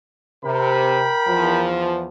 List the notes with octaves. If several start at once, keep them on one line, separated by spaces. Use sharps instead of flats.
C3 A#4 G5 B5
E2 F3